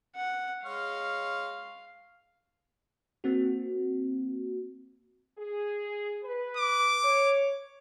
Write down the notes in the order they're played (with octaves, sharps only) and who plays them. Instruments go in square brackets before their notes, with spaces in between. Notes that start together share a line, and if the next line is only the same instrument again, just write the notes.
[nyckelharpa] F#5
[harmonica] G#3 C#5 F6 [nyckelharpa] F5
[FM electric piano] A#3 C4 F#4
[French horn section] G#4
B4
[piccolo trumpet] D6
[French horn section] C#5